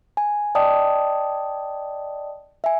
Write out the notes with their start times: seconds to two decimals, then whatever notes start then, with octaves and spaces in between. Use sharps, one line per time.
0.17 G#5
0.55 D5 D#5 G5 A5 D#6
2.64 E5 G#5